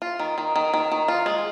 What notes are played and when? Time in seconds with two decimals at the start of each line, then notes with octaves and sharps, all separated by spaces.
0.02 F4
0.19 D#3
0.38 D#3
0.56 D#3
0.74 D#3
0.92 D#3
1.08 F4
1.26 G#3